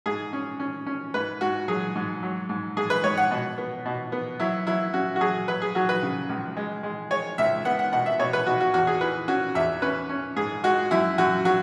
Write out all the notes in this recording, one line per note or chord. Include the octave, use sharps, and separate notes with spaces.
G#2 G#4
C#4
C#4
C#4
G#2 B4
G#2 F#4
F#3 G#4
G#2
F#3
G#2
G#2 G#4
B4
G#2 C#5
F#5
B2
B3
B2
B3
F#3 E4
F#3 E4
C#4 F#4
F#4
F#3 G#4
F#3 B4
G#4
F#3 F#4
B4
C#3
C#2
G#3
G#3
G#3 C#5
C#2 E5
B3 F#5
F#5
B2 F#5
E5
B2 C#5
B4
B2 F#4
F#4
E2 F#4
G#4
E3 B4
C#4 F#4
E2 E5
C#4 B4
C#4
G#2 G#4
G#3 F#4
F#2 E4
F#2 F#4
F#3 F#4